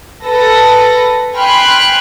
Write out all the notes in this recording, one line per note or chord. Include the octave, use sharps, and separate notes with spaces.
A4 B4 A#6
G5 G#5 B5 C6 F6 F#6